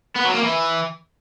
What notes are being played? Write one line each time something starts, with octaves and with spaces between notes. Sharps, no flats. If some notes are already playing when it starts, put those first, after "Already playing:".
B3
F#3
A#3
E3